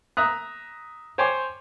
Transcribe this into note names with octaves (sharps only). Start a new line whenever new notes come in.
E5 A#5 D#6 F#6
C5 C#5 G5 G#5 C6 D6